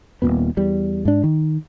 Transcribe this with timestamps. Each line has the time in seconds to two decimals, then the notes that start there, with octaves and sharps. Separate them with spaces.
0.22 D#1 G#1 A#2 B3
0.57 E2 G3
1.05 G#2 D4
1.24 D#3